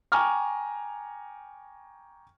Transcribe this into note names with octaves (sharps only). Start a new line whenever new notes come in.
G5 G#5 A#5 C#6 D6 F6